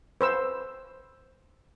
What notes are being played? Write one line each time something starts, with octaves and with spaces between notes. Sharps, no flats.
B4 C5 E6